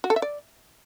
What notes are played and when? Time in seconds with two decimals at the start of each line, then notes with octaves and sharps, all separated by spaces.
0.04 F#4
0.10 A4
0.16 E5
0.22 D5